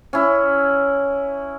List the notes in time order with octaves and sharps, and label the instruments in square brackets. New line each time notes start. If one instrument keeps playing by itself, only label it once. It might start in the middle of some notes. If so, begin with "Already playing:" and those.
[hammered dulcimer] C#4 E4